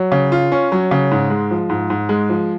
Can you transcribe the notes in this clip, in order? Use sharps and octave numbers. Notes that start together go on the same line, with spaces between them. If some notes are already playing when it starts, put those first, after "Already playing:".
Already playing: F#3
C#3
F4
C#4
F#3
C#3
G#2
G#3
F3
G#2
G#2
G#3
F3